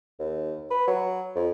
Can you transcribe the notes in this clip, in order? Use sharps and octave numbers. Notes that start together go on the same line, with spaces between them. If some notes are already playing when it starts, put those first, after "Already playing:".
D#2
B4
F#3
F2